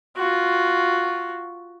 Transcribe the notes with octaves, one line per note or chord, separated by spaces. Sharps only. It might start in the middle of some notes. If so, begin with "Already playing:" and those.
F4 F#4